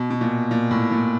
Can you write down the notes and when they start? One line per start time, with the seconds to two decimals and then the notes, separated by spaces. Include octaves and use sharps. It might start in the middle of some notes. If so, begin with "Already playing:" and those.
Already playing: B2
0.10 B2
0.21 A#2
0.51 A#2
0.71 A2
0.92 A#2